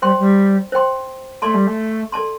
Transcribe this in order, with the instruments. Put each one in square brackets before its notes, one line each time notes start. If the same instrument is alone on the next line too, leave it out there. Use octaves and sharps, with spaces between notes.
[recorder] G3 [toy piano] C5 G5 C6
[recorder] G3
[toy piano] C5 G5 C6
[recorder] A3 [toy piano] A4 D5 A5 C6
[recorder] G3
A3
[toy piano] A4 D5 A5 C6